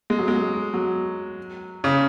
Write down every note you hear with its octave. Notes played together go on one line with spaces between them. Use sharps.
G#3
F#3
G#3
F#3
C#3